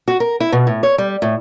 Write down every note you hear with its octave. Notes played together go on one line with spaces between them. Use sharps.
F#4
A#4
E4
B2
A2
C#5
G3
A2